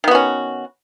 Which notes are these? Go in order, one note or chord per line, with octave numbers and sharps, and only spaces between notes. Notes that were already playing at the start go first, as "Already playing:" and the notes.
D#3 B3 C#4 F#4